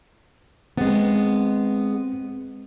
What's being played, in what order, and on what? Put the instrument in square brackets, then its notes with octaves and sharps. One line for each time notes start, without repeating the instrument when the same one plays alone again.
[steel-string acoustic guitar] G#3 B3 [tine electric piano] C4